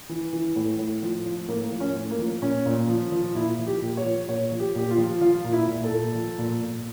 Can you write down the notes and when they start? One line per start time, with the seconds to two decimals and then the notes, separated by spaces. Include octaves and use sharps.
0.09 E3
0.33 E3
0.56 A2
0.79 A2
1.03 F3
1.26 F3
1.48 A2 A#3
1.72 F3
1.80 C#4
1.95 A2
2.11 A#3
2.19 F3
2.42 A#2 C#4
2.66 A#2
2.88 F3
3.12 F3
3.35 A#2 E4
3.59 F3
3.66 G4
3.82 A#2
3.97 C#5
4.05 F3
4.28 A#2 C#5
4.52 F3
4.60 G4
4.75 A#2 G4
4.91 F4
4.98 F3
5.21 F3 F4
5.44 A#2
5.52 E4
5.68 A#2
5.84 A4
5.91 A#2
6.15 F3
6.38 A#2
6.61 A#2